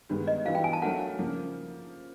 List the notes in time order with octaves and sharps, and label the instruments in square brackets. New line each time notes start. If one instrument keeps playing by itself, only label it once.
[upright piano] G2 D#3 G#3 B3
[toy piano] D#5
[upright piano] E3 G3 B3 D4 F#4 [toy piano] F5
[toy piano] G5
G#5
A5
[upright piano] F#3 A3 D4 F#4 A#4 [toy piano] F#5
[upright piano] C#3 F3 A#3